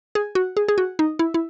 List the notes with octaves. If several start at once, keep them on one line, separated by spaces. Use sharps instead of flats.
G#4
F#4
G#4
G#4
F#4
D#4
E4
E4